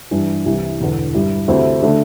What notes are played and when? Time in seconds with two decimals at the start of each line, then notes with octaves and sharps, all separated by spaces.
0.11 G2 E3 G3 D4
0.45 C2 C3 E3
0.81 E1 E2 D3
1.14 G2 G3 E4
1.48 D2 C3 A3 C4 E4
1.83 D3 A3 D4